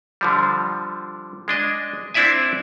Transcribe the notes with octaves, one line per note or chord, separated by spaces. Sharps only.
D3 F3 G3
G#3 D4 D#5
C4 D4 E4 D5 E5 G#5